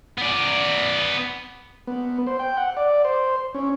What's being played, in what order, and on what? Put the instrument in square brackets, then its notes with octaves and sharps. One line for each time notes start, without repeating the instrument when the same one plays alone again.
[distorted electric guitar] B3 D5
[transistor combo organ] B3
C5
G5
F#5
D5
C5
C#4